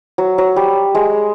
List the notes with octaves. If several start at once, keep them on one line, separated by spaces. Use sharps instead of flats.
F#3
F#3
G3
G#3